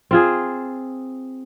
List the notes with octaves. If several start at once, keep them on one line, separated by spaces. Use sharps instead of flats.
C4 F4 G#4